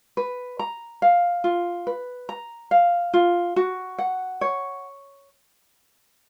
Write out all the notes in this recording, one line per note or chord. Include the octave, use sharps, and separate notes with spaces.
B4
A#5
F5
F4
B4
A#5
F5
F4
F#4
F#5
C#5